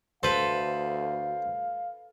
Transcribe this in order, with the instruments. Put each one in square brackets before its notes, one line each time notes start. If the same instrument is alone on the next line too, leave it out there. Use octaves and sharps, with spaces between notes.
[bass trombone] D2 [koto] A4 B4 [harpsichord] C5 [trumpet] F5